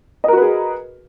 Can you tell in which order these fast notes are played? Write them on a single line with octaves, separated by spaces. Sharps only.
D#5 A#4 F#4 B4 G#4